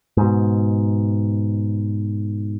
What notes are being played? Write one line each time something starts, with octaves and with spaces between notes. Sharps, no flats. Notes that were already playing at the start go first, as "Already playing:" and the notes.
G#2 B2